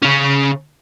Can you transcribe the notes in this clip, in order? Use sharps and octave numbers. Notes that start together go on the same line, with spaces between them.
C#3 C#4